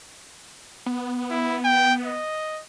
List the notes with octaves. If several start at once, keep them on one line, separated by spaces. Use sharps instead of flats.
B3
E4
G5
D#5